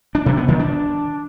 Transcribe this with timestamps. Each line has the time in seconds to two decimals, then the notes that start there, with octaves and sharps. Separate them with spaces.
0.15 D4
0.26 C3
0.37 B3
0.48 D#3
0.59 D4